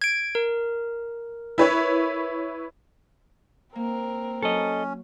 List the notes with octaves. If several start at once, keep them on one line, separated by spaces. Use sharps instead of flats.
G#6 D7
A#4
E4 B4 C#5
A#3 C4 A#4
F#3 C#4 A4 D#5